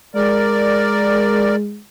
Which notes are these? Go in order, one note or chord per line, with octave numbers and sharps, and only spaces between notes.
G#3 A#4 D5